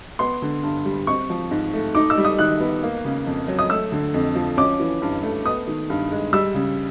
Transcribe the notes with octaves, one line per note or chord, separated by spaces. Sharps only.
B3 C6
D3
G2
G3
C4 C#6
F3
G#2
A3
D#4 D6
E6
G3
D#6
D#3 F#6
B3
A#3
C#3
F2
F#3
D#6
A3 E6
D3
F2
F3
C#4 D6
E3
G2
A3
B3 D#6
D#3
G2
G#3
G3 E6
C#3